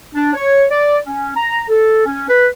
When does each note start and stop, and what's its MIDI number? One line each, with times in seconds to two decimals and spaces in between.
0.14 0.31 62
0.33 0.64 73
0.70 0.97 74
1.06 1.31 61
1.37 1.62 82
1.69 2.04 69
2.06 2.26 61
2.28 2.47 71